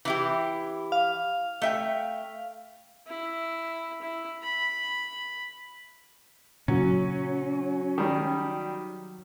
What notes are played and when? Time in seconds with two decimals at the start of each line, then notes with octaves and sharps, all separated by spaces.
0.05 E3 E4 G4
0.92 F5
1.62 A3 E5 G5
3.07 E4
4.02 E4
4.42 B5
6.68 A#2 C#3 F#3 C#4
7.98 D#3 G3